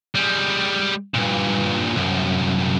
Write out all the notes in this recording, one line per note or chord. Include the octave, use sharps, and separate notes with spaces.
G3 G#3
G2 A#2
C2 F#2